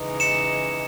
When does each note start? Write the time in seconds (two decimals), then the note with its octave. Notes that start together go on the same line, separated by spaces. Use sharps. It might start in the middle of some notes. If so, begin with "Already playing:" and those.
Already playing: C#3 E3 G#3 D#4
0.20 C#7 E7